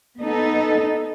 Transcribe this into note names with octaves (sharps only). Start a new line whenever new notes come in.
B3 D#4 A4